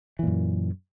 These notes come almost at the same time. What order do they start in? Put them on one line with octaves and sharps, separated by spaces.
E3 A#2 F#2